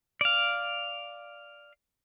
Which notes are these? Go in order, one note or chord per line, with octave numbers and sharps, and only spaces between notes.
D5 F5